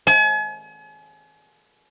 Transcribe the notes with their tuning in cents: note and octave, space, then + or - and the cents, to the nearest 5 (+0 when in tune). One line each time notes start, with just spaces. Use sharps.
G#5 +40